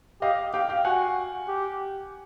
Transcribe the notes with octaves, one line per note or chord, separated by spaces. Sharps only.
G4 D#5 F5
G4 F5 G5
F5 G5
F#4 F#5 G#5
G4